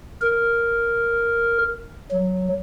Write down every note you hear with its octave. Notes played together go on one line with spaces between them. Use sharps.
A#4
F#3